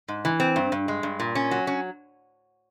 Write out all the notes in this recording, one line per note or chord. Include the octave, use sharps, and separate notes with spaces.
G#2
E3
C4
G2
G2
G#3
G2
A#2
C#4
F#3
C#4